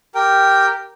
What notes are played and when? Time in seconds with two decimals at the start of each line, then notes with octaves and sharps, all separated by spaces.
0.15 G4 A#4 G5